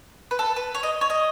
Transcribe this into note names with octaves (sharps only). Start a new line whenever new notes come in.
B4
A4
B4
C#5
D#5
C#5
D#5